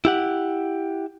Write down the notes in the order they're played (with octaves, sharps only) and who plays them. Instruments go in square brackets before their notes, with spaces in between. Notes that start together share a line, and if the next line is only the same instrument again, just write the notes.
[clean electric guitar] E4 G4 F#5